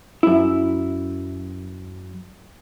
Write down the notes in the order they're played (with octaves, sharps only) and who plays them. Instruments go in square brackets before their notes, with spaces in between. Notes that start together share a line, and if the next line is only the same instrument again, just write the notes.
[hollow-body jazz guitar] F#2 E4